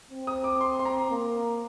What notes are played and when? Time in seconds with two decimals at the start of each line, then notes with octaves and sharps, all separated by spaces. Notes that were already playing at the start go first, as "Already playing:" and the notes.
0.10 C4
0.27 D#6
0.44 D6
0.61 C6
0.79 C6
0.85 A#5
1.11 A#3